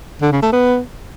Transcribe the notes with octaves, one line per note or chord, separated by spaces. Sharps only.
D3
C#3
A3
B3